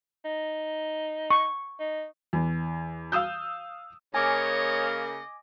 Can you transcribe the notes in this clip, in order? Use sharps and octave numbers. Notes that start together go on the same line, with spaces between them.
D#4
C#6
D#4
E2
F5 D#6 E6 G6
C#3 A#3 C#5 D#5 G#5 D6